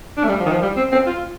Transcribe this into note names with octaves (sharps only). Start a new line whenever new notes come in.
D4
A3
G3
F3
D#3
F3
G3
C4
C4
F4